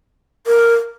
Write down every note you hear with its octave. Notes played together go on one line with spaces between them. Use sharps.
A#4